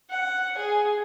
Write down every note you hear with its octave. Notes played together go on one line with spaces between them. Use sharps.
F#5
G#4